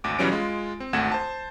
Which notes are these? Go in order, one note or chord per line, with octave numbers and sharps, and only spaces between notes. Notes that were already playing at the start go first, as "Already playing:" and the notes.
G#1 D2 D6
B1 E3 F#3 G3 C#4 D7
G#3 F4
C4
G#1 D2 A3 F#5 G#6 E7
C5 A5